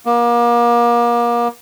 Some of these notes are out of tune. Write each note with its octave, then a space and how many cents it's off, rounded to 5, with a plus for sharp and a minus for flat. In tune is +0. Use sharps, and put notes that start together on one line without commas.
A#3 +35